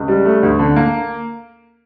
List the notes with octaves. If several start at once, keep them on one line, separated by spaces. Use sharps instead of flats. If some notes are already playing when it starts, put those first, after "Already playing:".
Already playing: C#2
G3
A3
D2
D3
A#3